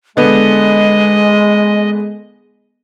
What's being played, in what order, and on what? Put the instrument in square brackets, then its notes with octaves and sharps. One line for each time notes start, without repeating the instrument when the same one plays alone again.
[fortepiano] D3 B3 [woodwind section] G#3 [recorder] D#5